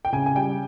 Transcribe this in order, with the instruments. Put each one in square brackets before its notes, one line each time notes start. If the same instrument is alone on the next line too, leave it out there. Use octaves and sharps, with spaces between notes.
[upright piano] G5
C#3 G#5
G#5
G3 G5